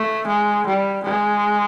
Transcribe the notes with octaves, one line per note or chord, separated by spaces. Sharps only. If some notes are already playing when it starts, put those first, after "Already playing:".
Already playing: A3
G#3
G3
G#3